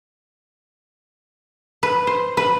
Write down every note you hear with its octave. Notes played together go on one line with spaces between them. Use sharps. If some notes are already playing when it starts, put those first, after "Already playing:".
B4
C5
B4